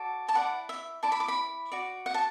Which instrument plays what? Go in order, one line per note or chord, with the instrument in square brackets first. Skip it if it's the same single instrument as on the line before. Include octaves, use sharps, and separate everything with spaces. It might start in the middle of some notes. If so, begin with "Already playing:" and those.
Already playing: [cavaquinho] F#4 A4 D5
A5
E4 D5 F#5
E5
E4 D5 A5
B5
D6
B5
F#4 D5
F#5
A5